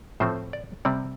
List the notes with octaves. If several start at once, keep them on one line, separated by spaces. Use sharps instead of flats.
A2 F3 A3 C4 C5
D5
C3 G3 C4 D5